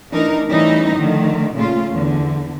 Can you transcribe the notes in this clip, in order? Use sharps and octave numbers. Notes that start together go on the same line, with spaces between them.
E3 A3 D4 D#4 A#4
E3 G3 A3 C#4 D#4 E4
D3 D#3 F3 A3
A#2 C#3 A3 F4
E2 D3